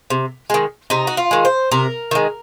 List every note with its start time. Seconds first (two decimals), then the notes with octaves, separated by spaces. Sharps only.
0.10 C3
0.50 D#3 G#3
0.90 C3 D#4
1.07 F#4
1.17 F4
1.31 D#3 G#3
1.45 C5
1.71 C3 A#4
2.11 D#3 G#3